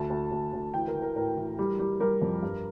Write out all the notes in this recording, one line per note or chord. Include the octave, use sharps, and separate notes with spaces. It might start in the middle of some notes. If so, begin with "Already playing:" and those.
Already playing: D2 A5
D2
D2
D2
E3 G5
A#4
E3
A#4
A2 A#4
E3
G3
G3
G3 A#4
F2
G2